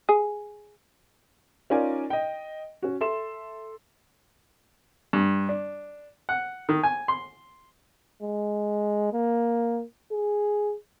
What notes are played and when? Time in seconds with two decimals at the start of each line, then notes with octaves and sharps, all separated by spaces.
0.09 G#4
1.70 C#4 D#4 F4 A#4 D5 G#5
2.10 D#5 G5
2.82 C#4 F#4
3.01 A4 E5 C6 E7
5.13 G2
5.49 D4
6.29 F#5
6.69 D#3
6.83 G#5
7.08 C6
8.23 G#3
9.13 A#3
10.12 G#4